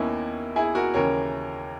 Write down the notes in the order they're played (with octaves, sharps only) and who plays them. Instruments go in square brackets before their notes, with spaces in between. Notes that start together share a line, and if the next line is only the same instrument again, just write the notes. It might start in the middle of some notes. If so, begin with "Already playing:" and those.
Already playing: [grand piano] D#2 A#3 B3 C#4 D#4 E4
E4 G#4
F#4 A#4
D#2 C#3 E3 A#4 C#5